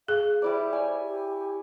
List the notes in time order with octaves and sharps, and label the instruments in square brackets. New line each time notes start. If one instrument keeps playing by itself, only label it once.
[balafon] G#4 [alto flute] F5
[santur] G3 E4 D5 [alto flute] C5
[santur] C#5 G#5
[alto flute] G4